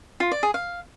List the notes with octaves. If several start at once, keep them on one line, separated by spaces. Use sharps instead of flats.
F4
D5
G#4
F5